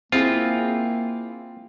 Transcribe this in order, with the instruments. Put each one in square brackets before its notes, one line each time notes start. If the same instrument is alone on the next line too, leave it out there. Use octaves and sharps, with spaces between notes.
[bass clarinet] A#3 [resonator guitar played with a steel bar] C4 E4 G#4 [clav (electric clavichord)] F4